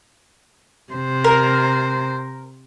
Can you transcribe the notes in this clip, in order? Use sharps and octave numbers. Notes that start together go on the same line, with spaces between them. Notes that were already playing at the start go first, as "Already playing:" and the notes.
C3 C5
A#4